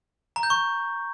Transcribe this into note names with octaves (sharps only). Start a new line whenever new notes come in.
A#5
G6
C#6